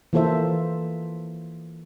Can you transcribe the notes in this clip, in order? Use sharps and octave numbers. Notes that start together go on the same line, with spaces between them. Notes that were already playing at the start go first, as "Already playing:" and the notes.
E3 A#3 F4 A4 C5 E5